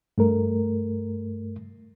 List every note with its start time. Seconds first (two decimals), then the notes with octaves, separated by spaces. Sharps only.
0.18 G2 A3 A#4